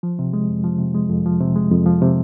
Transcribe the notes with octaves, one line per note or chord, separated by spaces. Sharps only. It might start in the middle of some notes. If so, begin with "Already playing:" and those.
F3
C3
G#3
F2
F3
C3
G#3
F2
F3
C3
G#3
F2
F3
C3